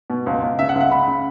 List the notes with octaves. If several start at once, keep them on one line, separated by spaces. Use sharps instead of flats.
B2
C#2
C#2
C#3 E5
F#5
C#2
F#5
C#3 B5
C#3